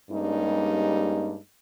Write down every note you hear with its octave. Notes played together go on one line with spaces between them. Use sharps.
G2 G3 G#3 A#3 C#4 D#4